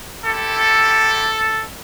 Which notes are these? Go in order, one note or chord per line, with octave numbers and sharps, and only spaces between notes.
C4 E4 G4 A4